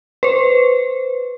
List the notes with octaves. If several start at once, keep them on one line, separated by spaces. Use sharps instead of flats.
B4 C5